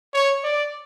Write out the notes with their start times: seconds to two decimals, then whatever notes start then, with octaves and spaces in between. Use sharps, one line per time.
0.14 C#5
0.44 D5